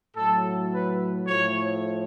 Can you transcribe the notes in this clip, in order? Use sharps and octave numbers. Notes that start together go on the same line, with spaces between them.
A2 F#3 A4
B4
A2 F3 C#5